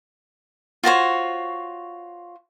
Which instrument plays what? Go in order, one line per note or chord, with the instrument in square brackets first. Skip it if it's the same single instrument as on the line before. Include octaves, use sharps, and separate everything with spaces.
[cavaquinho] F4 F#4 C5 C#5